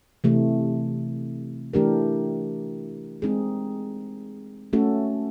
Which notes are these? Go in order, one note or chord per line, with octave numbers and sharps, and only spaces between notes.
C3 E3 A3
E3 A3 D4 G4 A#4
G#3 C4 D#4 G#4
A3 C#4 F#4 A4